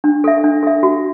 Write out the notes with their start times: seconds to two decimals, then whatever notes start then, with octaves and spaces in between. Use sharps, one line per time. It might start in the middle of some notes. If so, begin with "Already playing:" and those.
0.04 D4
0.24 A4 E5
0.44 D4
0.63 A4 E5
0.83 F#4